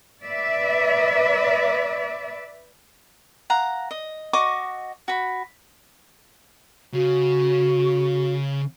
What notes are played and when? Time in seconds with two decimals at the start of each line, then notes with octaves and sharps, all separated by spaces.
0.24 B4 D5 E5
3.50 F5 F#5 A#5
3.91 D#5
4.33 F#4 D#5 C#6 D6
5.08 F#4 B5
6.94 C#3 F#4